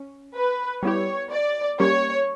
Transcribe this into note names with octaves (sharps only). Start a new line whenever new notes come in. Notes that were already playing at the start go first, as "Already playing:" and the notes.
Already playing: C#4
B4
G3 B3 E4 G4 C#5
D5
G3 A#3 C#4 G4 C#5